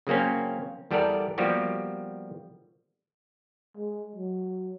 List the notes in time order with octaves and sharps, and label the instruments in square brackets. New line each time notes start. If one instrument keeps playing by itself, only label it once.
[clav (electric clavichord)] C#3 F#3 A#3 C4 C#4
E2 G3 B3 A4 A#4 D5
F3 G3 A#3 B3 F#4 G4
[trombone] G#3
F#3